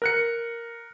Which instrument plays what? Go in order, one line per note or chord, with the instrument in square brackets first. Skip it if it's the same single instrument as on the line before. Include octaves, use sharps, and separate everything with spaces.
[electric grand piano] A#4 F#6 C#7